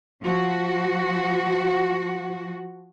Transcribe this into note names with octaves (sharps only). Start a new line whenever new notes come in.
F3 F#4